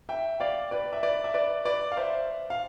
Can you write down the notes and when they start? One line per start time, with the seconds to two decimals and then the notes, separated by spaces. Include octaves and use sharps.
0.09 E5 G5
0.40 D5 F5
0.71 B4 D5
0.93 E5
1.03 B4 D5
1.24 E5
1.34 B4 D5
1.65 B4 D5
1.92 F5
1.97 C5 E5
2.50 F5